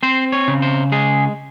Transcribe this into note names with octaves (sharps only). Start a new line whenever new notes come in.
C4 C5
C#5
C#3
C5
G#3 G#4